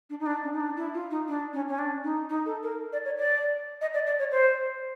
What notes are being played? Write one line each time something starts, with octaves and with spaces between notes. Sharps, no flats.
D4
D#4
D4
C#4
D#4
D4
E4
F4
D#4
D4
C#4
C#4
D4
D#4
D#4
A4
A#4
D5
C#5
D5
D#5
D5
D5
C#5
C5